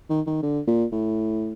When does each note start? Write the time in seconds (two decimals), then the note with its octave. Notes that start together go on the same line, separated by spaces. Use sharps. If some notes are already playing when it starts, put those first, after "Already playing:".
0.10 D#3
0.27 D#3
0.43 D3
0.67 A#2
0.92 A2